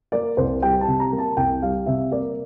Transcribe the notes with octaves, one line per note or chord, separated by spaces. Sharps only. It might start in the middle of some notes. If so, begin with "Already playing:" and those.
A#3 D5
C2 C5
G3 G5
A5
C3
A#5
A#3
A5
C2 G5
G3 F5
C3 E5
A#3 D5